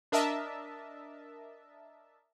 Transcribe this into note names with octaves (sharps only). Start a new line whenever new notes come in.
D4 A#4 D#5 E5 A5